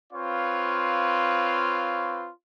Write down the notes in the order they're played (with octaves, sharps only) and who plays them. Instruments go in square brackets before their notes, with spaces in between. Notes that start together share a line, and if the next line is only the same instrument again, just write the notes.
[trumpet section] C4 F4 B4 C#5 F5